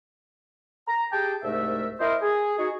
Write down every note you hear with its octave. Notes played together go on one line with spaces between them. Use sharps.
A#5
G4 G#4 G5 A5
C2 G#2 A3 A#4 E5
E4 A#4 C5 D#5
G#4
D#4 F#4 G#4